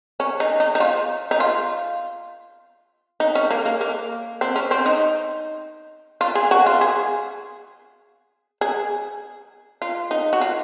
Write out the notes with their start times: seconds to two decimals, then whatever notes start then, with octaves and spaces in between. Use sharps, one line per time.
0.20 C#4
0.40 D#4
0.60 D#4
0.75 D#4
0.80 F4
1.31 D#4
1.40 F4
3.20 D#4
3.35 C#4
3.51 A#3
3.66 A#3
3.81 A#3
4.41 C4
4.56 C#4
4.71 C4
4.86 D#4
6.21 F4
6.35 G#4
6.51 F#4
6.66 F4
6.81 G#4
8.61 G#4
9.82 F4
10.11 D#4
10.33 F#4
10.41 F4